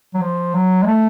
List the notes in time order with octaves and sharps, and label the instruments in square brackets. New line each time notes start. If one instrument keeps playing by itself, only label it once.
[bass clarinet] F#3
F3
F#3
G#3
A3